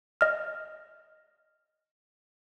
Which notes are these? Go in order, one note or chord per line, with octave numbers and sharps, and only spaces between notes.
D#5 F6